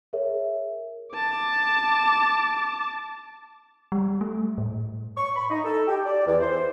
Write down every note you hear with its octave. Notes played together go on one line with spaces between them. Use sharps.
G#4 A#4 C#5 E5
A5 D6
G3
A3
A2
C#6
B5
D#4
A4
G4
D5
E2
C5